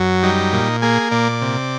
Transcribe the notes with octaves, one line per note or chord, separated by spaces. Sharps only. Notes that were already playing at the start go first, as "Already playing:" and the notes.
Already playing: F#2 F#3
G3 D#4
A#2
A#3 G#4
A#2 D5
C3